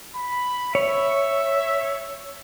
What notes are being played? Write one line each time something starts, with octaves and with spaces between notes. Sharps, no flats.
B5
C#5 E5